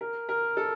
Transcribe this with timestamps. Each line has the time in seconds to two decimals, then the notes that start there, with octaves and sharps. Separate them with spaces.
0.01 A#4
0.29 A#4
0.57 A4